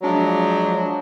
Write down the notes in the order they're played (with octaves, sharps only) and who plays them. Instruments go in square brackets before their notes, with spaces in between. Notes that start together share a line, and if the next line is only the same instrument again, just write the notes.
[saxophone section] F3 F#3 G#3 D4